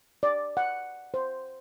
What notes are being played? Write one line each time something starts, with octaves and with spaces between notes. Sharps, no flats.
D5
F#5
C5